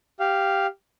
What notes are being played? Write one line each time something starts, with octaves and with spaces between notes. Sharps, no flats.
G4 F5